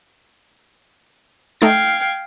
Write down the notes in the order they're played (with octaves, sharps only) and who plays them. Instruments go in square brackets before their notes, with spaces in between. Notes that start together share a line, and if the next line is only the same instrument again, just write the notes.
[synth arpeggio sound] A3 D#4 A6 [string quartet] F5 G5 G#6